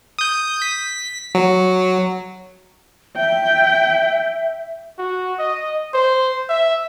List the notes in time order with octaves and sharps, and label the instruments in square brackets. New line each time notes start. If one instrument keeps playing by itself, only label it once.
[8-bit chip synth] D#6 G6
B6
F#3
[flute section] E5 [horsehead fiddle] G5
[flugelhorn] F#4
D#5
C5
E5